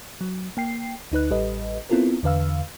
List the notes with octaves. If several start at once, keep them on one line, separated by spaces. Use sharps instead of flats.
F#3
A#3 G5 C7
D2 D#4 B4 F#6
A1 G3 G4 A4 B4 D#5
B3 C4 E4 F4 A4 A#4
E2 D3 B4 F5 E6